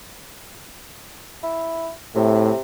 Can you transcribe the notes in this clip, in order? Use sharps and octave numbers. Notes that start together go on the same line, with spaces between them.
E4
A2 C3